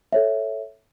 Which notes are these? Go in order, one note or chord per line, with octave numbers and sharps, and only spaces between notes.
A4 C#5 E5